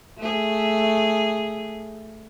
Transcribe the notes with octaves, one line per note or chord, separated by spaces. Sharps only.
A3 G#4